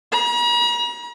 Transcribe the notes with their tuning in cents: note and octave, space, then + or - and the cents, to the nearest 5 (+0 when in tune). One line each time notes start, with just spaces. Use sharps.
A#5 +45